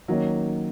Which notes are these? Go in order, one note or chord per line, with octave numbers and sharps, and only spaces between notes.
D#3 F#3 A#3 C#4